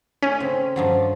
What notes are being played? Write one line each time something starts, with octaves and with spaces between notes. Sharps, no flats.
A3 C#4
C#3 C4
G2 F3 F#3